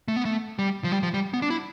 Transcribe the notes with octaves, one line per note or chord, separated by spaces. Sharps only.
A3
B3
A3
G3
F3
G3
F3
G3
B3
D4
E4